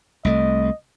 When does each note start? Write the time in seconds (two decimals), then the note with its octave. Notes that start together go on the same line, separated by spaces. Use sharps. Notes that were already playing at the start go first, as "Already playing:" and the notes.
0.25 C2 A3 D#5